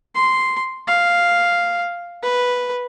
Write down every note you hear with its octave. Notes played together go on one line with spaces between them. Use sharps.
C6
F5
B4